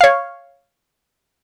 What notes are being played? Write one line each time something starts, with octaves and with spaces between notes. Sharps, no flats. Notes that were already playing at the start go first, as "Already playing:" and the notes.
C#5 F5